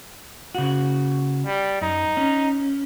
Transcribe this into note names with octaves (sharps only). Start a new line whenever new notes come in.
C#3 F#4
G3
F#2 D#4
C#4